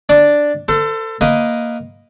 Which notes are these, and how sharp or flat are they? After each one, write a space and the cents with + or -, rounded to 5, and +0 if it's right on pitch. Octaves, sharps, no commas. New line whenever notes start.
D4 +0 D5 +0
A4 +25 C5 -35
A#3 +0 B4 +10 D#5 +0